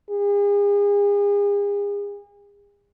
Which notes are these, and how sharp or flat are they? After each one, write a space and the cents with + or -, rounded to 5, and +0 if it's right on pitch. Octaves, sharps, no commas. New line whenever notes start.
G#4 -40